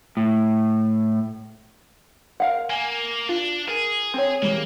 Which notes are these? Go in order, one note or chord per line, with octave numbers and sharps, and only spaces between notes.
A2
A#4 F5 F#5
A#3 G#5
D4 F4
G#4 A#4
C4 C#5
E3 G3 G#3 A#3